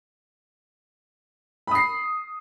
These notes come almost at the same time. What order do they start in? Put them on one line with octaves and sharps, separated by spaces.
B5 D#6 C7